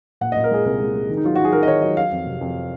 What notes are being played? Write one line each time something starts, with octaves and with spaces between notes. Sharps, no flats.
A#2 F#5
A#2 D#5
A#4
G#3 G#4
C2 A#4
G#3
G#3
D#3
D#4
F#3 F4
D#3 F#4
G#4
D#3 A#4
D#5
D#3 C#5
F#3 D#5
F#3 F5
F2
C3
F2